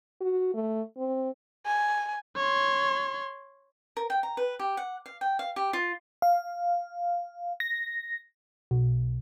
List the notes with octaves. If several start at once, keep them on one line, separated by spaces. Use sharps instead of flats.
F#4
A3
C4
G#5
C#5 C6
A#4
G5
A#5
B4
G4
F#5
F5
G5
F5
G4
F4
F5
A#6
B1